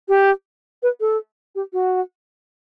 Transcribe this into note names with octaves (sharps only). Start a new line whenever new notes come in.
G4
B4
A4
G4
F#4